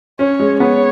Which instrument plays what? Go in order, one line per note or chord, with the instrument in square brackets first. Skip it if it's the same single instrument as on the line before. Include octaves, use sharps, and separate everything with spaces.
[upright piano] C#4 [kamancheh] C#5
[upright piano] G#3
[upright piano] B3 [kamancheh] C#5